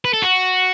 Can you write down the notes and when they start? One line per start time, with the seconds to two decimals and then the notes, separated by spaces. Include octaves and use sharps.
0.05 B4
0.13 A4
0.22 F#4